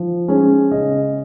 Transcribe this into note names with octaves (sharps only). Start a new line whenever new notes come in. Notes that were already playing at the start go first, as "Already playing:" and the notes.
Already playing: F3
G#3 C#4
C#3 D#5